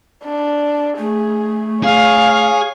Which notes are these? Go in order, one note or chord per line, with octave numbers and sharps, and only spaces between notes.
D4
A3 G#4
G#4 C#5 F5